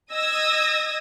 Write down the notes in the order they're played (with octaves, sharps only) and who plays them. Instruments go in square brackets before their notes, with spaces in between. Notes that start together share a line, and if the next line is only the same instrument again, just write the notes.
[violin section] D#5 D#6 E6 G#6 A#6